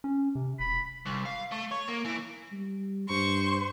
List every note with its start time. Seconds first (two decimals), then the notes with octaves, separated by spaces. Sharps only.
0.04 C#4
0.35 C3
0.60 E1 B5
1.06 C2
1.25 F5
1.51 A3
1.71 C#5
1.88 A#3
2.05 E3
2.52 G3
3.09 G2 C5 C#6